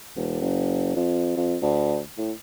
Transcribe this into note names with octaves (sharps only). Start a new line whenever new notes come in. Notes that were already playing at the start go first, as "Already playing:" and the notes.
E1
F#1
F2
F2
D2
A2